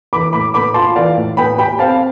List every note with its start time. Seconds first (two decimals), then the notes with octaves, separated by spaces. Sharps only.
0.13 E3 B5 D6
0.33 A2 B5 D6
0.54 B3 B5 D6
0.74 F4 A5 C6
0.96 E3 D5 F5
1.17 A2
1.37 B3 G5 B5
1.58 G4 G5 B5
1.79 C4 F5 A5